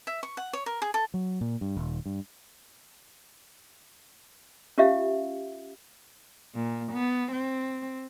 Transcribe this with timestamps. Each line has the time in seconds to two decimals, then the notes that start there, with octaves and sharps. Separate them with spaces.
0.07 E5
0.23 C#6
0.37 F#5
0.53 C#5
0.66 A#4
0.82 G#4
0.94 A4
1.14 F#3
1.41 A#2
1.61 G2
1.77 D#1
2.06 G2
4.78 C#4 F4 G4 E5 F5
6.55 A#2
6.93 B3
7.32 C4